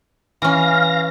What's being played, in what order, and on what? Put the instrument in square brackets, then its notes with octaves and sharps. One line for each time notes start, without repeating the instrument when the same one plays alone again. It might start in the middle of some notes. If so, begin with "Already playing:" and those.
[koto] E3 C#4 [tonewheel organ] F5 A#6